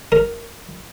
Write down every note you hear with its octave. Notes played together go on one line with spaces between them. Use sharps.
A#4